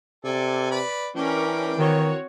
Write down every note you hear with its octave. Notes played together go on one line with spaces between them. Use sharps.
C3 A4 D5 G#5
B4 D5 B5
E3 C#4 D4 A#4 G5 D6
D#3 C4 F#4 C#5